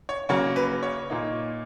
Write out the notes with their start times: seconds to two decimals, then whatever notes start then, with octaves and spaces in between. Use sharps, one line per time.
0.09 C#5
0.29 C#3 F#3 A#3 C#4 C#5
0.56 B4
0.83 C#5
1.10 A#2 A#3 D#4